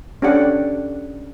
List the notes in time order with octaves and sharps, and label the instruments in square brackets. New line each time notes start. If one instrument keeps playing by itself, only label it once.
[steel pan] C#4 D4 G4 A4 D5 F#5